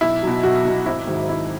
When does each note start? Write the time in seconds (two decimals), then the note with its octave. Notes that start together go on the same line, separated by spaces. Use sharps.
0.01 B1 E4
0.23 B2 F#3
0.43 B1 F#4
0.65 B2 F#3
0.86 G#1 E4
1.07 G#2 D#3 F#3
1.28 G#1 E4